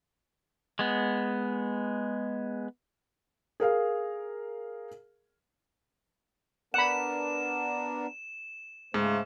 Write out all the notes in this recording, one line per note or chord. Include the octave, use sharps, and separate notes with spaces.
G#3 B3
G#4 A#4 F5
B3 D4 A#4 F#5 B5 E7
G#2 C#3 A3 C5